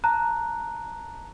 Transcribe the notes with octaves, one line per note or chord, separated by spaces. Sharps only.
A5 A#5 F#6